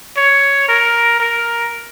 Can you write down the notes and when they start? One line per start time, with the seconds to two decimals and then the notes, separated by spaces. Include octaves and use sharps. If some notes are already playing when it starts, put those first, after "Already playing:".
0.17 C#5
0.69 A#4
1.20 A#4